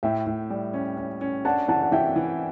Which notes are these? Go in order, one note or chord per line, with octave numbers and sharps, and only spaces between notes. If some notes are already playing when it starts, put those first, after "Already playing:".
A2 E5 G5
A2
G3
C#4
C#4
C#4
D4 F#5 A5
E3 F#5 A5
F#5
E3 E5 G5
E3